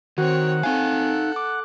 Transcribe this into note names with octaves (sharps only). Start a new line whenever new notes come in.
D#3 C4 F#4 C#5 F#5
C4 D#4 A4 F5 G#5
D6 F#6